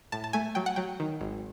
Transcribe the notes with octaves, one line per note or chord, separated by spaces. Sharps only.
A2 A5
A5
A3 G#5
F#3 G5
F#5
F#3 G5
D#3
G#1